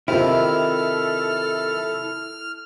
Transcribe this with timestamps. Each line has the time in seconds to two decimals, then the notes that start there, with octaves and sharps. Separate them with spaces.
0.08 C3 D#3 E4 F4 A4 F6